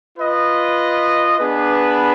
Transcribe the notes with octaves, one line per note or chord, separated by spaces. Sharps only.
F4 B4 D#5
B3 D4 G#4 B4